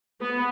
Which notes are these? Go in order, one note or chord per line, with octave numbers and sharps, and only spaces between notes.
B3